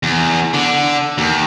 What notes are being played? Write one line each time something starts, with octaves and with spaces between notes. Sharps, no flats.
E2
D3
D#2